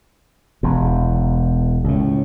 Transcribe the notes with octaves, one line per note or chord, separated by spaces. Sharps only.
E1 E2
C#2 A2